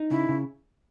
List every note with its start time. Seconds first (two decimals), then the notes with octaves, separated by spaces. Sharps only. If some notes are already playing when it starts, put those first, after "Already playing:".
Already playing: D#4
0.11 C#3 E4
0.29 C#3